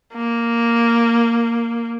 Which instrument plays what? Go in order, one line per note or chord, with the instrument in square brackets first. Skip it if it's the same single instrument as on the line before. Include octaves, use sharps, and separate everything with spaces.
[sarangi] A#3